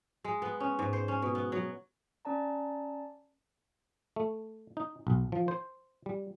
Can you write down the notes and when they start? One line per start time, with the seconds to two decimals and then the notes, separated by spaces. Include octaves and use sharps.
0.24 G#3
0.42 B3
0.60 C#4
0.79 G#2
0.93 C5
1.08 C#4
1.22 B2
1.35 B3
1.52 F#3
2.25 C#4 D5 A5 A#5
4.16 A3
4.77 D#4
5.07 B1
5.32 F3
5.48 C5
6.06 G3